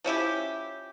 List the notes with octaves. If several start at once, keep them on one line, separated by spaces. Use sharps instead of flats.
F3 C#4 E4 G4